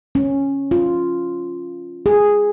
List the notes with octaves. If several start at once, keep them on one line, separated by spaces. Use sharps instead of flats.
C#4
F4
G#4